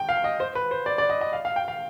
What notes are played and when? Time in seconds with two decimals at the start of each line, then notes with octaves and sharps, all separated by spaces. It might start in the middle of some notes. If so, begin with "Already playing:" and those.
Already playing: G5
0.09 F5
0.24 D#5
0.40 C5
0.55 B4
0.71 C5
0.86 D5
0.98 D5
1.10 D#5
1.21 D#5
1.33 F5
1.45 F5
1.56 G5
1.68 F5